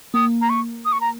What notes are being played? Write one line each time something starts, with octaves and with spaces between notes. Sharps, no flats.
A#3 D#6
A#5
C#6
D#6
C#6
A#5